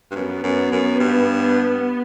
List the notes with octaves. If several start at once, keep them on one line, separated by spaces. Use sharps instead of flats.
G2
F#2 B3
F#2
F#2
G2